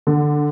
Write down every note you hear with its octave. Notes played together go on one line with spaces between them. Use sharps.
D3